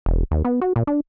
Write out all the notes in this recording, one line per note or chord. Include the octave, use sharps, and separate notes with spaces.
E1
D#2
B3
F#4
A#2
D4